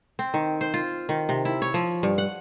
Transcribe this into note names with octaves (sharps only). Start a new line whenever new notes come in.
C4
D#3
C5
F4
D#3
C3
E4
C#5
F3
G2
F#5